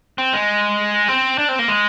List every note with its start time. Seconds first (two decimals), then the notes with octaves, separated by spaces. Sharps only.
0.18 C4
0.33 G#3
1.08 C4
1.38 D4
1.49 C4
1.59 A#3
1.68 G#3